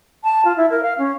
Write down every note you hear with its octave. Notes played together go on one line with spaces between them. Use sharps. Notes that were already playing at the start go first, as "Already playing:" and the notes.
A5
F4
E4
A#4
F5
C#4